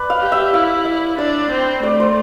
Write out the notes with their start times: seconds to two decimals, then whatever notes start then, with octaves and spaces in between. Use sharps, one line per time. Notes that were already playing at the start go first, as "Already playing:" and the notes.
Already playing: B4 D5
0.10 F5
0.21 G4
0.32 E5
0.54 E4 F5
0.85 E5
1.18 D4 D5
1.51 C4
1.83 A3 D5
2.00 C5